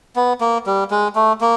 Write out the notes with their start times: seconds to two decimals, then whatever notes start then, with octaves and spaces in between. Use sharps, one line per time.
0.16 B3
0.41 A#3
0.66 G3
0.91 G#3
1.15 A3
1.41 A#3